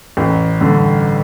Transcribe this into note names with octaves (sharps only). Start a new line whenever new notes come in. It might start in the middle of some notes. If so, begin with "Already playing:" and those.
A1
G2 D3